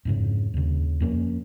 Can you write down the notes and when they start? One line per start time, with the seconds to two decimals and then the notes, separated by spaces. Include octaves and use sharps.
0.05 F2 G#2 C#3
0.54 D#2 C#3
1.00 F2 A#3 C#4